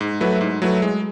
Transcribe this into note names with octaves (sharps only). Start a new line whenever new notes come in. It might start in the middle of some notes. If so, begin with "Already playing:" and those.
G#2
F#3 A3 E4 B4
G#2
F#3 A3 E4 B4
G#3